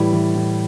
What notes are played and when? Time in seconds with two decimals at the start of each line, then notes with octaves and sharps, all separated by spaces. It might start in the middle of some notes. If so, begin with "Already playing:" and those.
Already playing: A2 E3 G3
0.13 E3
0.35 A2